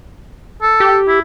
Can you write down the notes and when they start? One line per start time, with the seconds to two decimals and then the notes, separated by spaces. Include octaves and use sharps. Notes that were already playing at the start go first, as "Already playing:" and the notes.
0.62 A4
0.80 G4
1.08 E4